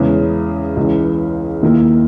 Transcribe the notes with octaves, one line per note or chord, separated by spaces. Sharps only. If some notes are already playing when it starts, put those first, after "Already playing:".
Already playing: E2 C#3 G#3 C#4
C#2 C#3 E3
D#2 D#3 A#3 E4